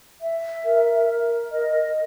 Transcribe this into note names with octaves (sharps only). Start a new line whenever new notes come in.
E5
A#4
A#4
D#5